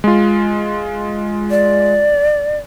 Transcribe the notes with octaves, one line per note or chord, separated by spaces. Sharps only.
G#3 F4
D5